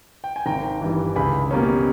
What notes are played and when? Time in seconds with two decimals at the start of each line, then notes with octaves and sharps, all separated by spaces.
0.24 G5
0.36 G#5
0.46 G#1 G5 A#5
0.81 G2 E3
1.16 C#2 G#5 B5
1.51 B2 G3 A#3 C#4